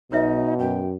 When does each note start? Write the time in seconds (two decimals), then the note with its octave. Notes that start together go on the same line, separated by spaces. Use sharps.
0.12 B1 B2 D#4 B4 C#5 E5
0.59 F#2 G5